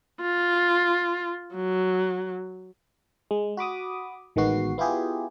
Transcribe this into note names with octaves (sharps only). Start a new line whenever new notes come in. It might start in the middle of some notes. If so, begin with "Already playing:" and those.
F4
F#3
G#3
F#4 B5 D6 D#6
A1 D#3 G#3 B3 F#4 C7
B3 E4 F4 G4 G#4